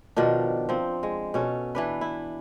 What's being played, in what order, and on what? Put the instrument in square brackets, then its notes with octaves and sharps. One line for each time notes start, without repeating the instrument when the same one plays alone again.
[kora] B2 D#3 F3 D4
F3 C4
G#3
B2 C#4 A4
E3 D4 B4
E4